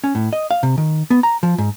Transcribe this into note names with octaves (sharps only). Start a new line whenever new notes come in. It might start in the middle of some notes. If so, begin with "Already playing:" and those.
C#4
A2
D#5
F5
C3
D#3
B3
A#5
F3
G#2